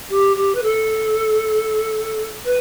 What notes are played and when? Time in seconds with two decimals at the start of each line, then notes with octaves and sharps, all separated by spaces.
0.10 G4
0.36 G4
0.55 B4
0.62 A4
2.45 B4